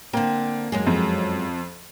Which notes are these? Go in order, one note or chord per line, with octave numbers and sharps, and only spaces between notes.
D3 A#3 C4
F#2 F#3 G#3
F2